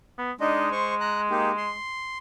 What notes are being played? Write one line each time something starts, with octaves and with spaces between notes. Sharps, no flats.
B3
G#3 D4 D#4 D#5
C5 C#6
A#5 F#6
A#3 D#4 G4
C6